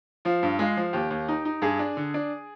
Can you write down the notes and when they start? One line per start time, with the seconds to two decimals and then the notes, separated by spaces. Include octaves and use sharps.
0.25 F3 F4
0.43 G2
0.59 G#3 F4
0.77 F3
0.93 D#2 G4
1.11 D#2
1.28 D#4
1.45 D#4
1.62 G2 G#4
1.79 D4
1.97 D3
2.14 D4